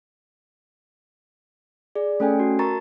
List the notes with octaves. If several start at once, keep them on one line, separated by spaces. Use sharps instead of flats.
G#4 D5
A3 C#4 A4 G5 G#5
F#4
A#4 A5 A#5 C#6 A6